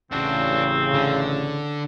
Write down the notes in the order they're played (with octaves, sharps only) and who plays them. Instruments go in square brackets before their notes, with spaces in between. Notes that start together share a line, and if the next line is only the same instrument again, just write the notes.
[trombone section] A1 C#3 [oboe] C4 [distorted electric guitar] D4 F#4
[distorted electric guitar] D3